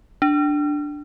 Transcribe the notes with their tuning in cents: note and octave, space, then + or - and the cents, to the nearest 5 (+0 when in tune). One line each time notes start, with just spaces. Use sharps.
D4 +5